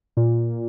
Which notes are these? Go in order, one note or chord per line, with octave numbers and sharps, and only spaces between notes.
A#2